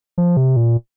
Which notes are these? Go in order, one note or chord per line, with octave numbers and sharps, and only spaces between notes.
F3
C3
A#2